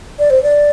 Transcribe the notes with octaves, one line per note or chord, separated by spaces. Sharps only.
D5
C5
D5